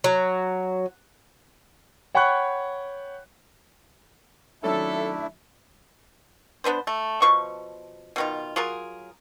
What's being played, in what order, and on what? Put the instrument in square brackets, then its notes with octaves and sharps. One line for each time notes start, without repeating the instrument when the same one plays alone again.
[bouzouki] F#3
[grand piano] C#5 F#5 G5 B5 C#6 F#6
[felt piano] D#3 F#3 C#4 [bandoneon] A3 D4 E4 [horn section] A4 [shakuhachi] E5
[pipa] B3 D4 B4 C5
A3
B2 F3 C#6
B2 D#3 F4
F#3 F4 G#4 A#4